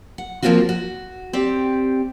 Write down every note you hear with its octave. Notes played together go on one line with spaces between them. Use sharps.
F#5
F3 G3 A#3 C4 F4 F#4
F#4
C4 G4 D5